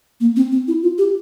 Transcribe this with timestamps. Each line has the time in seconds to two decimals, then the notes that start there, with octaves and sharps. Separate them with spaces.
0.20 A#3
0.36 C4
0.52 C4
0.68 E4
0.83 F4
0.98 G4